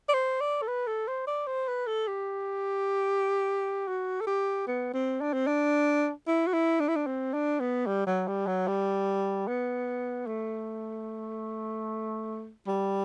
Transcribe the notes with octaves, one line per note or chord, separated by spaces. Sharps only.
D5
C5
D5
A4
B4
A4
C5
D5
C5
B4
A4
G4
F#4
A4
G4
B3
C4
D4
C4
D4
E4
F#4
E4
D4
E4
D4
C4
D4
B3
G3
F#3
G3
F#3
G3
B3
A3
G3